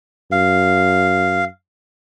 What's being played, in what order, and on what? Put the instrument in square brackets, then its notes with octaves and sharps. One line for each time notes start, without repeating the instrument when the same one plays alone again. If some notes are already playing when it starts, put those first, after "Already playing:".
[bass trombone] F#2 [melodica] F5